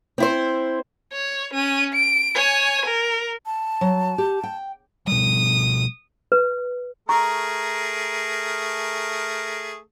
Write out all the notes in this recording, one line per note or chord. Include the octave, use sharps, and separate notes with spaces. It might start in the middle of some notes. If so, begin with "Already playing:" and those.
C4 E4 C5
C#5
C#4 D#7
D7
C#5 G#5
A#4
A5
F#3
G4
G5
B2 F3 G3 D#6
B4
A3 G#4 A#4 A#5 C#6